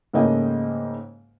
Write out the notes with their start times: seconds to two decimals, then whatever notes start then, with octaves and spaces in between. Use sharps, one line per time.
0.13 G#2 C#3 A3 A#3 D#5 G5